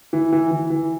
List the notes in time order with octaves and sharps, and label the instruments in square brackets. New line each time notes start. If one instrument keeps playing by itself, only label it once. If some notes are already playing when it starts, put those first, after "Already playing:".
[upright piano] E3
E3
E3
E3